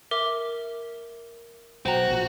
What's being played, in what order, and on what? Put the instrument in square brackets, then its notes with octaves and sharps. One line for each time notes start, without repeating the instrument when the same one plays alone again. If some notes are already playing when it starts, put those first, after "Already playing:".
[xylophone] A#4 E5 D6
[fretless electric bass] B1 [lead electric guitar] F#4 [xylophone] C5 G5 A#5
[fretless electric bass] A#1 A#2